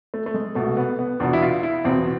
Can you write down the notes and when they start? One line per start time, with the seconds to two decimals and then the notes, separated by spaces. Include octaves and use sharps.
0.14 A3
0.26 A3
0.34 G#3
0.55 C2 B2 A3
0.77 B3
0.99 B3
1.20 E2 B2 D4
1.33 E4
1.42 F4
1.63 E4
1.85 E2 B2 C4